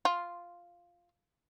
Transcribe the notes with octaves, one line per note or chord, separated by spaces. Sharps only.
F4